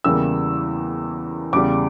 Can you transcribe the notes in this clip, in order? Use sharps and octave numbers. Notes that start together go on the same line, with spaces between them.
E2 C#3 E3 G3 A#3 E6
E2 C#3 G3 D6